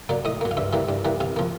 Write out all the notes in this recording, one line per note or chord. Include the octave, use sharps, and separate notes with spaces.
F#3 A#3 D5
A2 D#5
F#3 A#3
F5
G2 E5
E3 G3 A#3
G2
E3 G3 A#3
C3 F5
F3 A#3